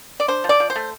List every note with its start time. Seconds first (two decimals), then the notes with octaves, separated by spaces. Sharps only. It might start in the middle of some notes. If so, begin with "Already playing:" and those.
0.20 D5
0.28 D4 C5
0.44 F3
0.49 D5
0.60 F3
0.70 C5
0.76 A3